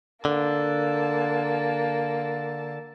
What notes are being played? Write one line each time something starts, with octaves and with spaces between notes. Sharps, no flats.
D3 A#3 A5